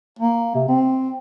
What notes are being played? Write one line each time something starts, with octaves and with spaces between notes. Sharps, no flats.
A#3
C3
C4